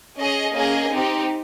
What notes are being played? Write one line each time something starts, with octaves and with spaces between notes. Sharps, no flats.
C#4 G#4 D#5
A#3 C#4 G#4 D#5 G#5
C4 D#4 G4